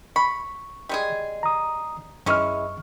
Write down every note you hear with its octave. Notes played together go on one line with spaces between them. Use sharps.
B5 C#6
G3 G#3 G#4
A#5 D#6
F#2 E3 G#3 C#4 C#6 F6